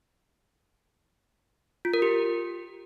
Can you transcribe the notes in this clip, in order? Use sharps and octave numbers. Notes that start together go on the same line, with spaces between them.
F4
A#4
G4